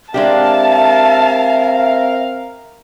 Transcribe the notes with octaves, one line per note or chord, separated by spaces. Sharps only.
G#3 C4 D4 G4 A#4 E5 F5 A5